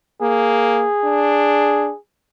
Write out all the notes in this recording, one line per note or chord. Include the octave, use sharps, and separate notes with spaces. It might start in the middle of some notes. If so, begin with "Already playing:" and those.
A#3 G#4
D4